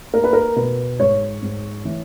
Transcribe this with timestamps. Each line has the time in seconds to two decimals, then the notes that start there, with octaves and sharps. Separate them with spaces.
0.14 A#3 A#4
0.24 B4
0.33 A#4
0.56 B2 B4
1.00 G#2 C#5
1.42 G#2
1.85 E3